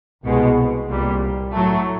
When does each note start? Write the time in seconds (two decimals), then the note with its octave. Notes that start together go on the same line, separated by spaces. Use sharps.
0.22 C2 B2 G#3
0.88 C2 A#2 G3
1.53 A2 F#3 A3